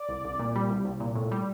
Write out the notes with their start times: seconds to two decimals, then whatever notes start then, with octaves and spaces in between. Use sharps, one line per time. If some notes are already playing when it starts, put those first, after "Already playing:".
Already playing: D5
0.09 C2
0.25 C2
0.39 A#2
0.55 G3
0.70 C2
0.85 C2
1.00 A#2
1.16 A2
1.31 G3